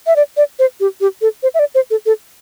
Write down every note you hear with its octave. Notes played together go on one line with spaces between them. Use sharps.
E5
D5
D5
C5
G4
G4
A4
C5
E5
D5
C5
A4
A4